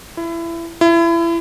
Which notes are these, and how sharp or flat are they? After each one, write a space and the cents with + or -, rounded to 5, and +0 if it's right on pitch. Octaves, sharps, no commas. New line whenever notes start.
E4 +25
E4 +30